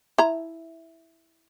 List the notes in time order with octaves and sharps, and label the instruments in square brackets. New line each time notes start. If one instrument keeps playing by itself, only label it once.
[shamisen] E4 A#5